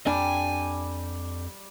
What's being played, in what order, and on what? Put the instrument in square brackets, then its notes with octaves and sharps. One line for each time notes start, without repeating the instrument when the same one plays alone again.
[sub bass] F2 [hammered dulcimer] G3 [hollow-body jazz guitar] D4 [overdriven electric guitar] G#5